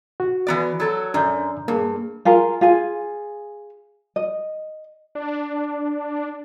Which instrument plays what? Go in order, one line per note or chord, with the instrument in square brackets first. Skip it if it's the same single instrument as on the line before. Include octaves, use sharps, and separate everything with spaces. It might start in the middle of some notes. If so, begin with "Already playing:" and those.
[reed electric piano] F#4
[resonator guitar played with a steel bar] E3 B3 D5
F#3 A4
[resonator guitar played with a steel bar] F#2 [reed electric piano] D4 D5 G6
[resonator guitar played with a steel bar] G2 [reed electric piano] A#3 G#4
[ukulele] F4 G#4 A#4
F4 G#4 G#5
D#5
[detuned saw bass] D4